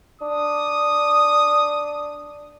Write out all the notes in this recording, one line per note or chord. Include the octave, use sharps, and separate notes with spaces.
D4 D#6